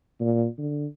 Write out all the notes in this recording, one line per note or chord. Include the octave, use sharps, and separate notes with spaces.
A#2
D3